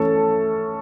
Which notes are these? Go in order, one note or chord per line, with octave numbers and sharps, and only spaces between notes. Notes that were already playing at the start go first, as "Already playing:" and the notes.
Already playing: E3 A3 C#4 A4